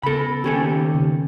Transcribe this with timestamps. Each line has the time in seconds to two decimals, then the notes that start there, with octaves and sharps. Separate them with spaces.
0.03 C#3 B3 A4 B5
0.44 D#2 C#4 G4 A4
0.94 C#3